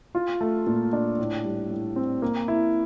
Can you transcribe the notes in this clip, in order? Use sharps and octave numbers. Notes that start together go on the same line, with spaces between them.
F4
A3
A#2
D4
A2
G3
A2
C4
A#3
E4